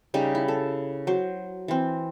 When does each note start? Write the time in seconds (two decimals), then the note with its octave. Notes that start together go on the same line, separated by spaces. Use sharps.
0.14 C#3 G3 D#4 G4
0.35 E4
0.48 A4
1.07 F#3 C5
1.68 E3 C4